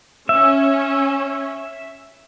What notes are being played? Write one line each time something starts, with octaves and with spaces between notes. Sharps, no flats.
C#4 E5